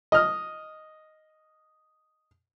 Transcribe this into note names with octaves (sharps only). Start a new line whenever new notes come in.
D#5 F6